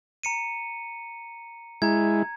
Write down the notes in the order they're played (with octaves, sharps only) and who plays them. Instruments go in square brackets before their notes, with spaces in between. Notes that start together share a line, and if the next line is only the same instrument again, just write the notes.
[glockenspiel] A#5 C#7 D#7
[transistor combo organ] G#3 E4 [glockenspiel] A#5 G#6